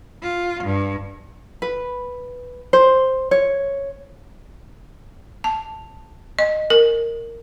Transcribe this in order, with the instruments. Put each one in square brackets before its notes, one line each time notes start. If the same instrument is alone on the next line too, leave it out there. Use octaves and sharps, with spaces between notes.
[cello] F4
G2
[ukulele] B4
C5
C#5
[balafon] A5
D#5
A#4